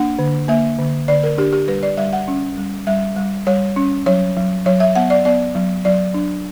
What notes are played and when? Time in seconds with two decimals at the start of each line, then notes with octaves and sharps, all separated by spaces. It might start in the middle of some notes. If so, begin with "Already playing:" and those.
Already playing: A#3 D4 F#5
0.19 D3
0.48 A#3 E5
0.79 D3
1.08 D3 D5
1.23 A#4
1.38 D4 G4
1.53 G4
1.68 G3 B4
1.83 D5
1.97 G3 E5
2.13 F#5
2.28 C#4
2.57 G3
2.87 G3 E5
3.17 G3
3.47 G3 C#5
3.76 C#4
4.06 F#3 C#5
4.36 F#3
4.66 F#3 C#5
4.80 E5
4.95 B3 F#5
5.10 D5
5.25 B3 D5
5.55 F#3
5.85 F#3 D5
6.14 D4